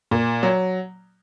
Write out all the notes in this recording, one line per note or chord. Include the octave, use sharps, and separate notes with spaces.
A#2
F#3